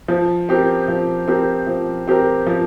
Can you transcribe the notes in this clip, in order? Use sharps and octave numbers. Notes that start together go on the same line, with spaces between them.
F3
C4 G4 A#4
F3
C4 G4 A#4
F3
C4 G4 A#4
F3